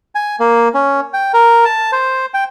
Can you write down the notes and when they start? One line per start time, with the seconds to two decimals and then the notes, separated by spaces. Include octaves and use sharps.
0.15 G#5
0.40 A#3
0.74 C#4
1.13 G5
1.34 A#4
1.65 A5
1.92 C5
2.34 G5